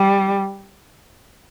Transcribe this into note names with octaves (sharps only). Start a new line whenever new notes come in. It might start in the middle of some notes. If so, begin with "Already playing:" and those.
Already playing: G3